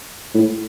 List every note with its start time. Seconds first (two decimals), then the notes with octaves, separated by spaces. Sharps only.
0.34 A2